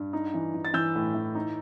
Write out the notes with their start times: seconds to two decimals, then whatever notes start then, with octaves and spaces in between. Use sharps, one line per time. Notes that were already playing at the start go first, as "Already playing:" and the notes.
Already playing: G2
0.13 D#4
0.34 E3
0.54 E3
0.65 A6
0.74 E3 E6 G6
0.95 A2
1.14 E3
1.35 D#4